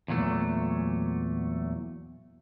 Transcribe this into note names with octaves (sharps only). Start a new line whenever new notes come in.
E2 A#2 F#3 A3